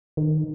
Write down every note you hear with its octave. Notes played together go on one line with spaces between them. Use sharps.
D#3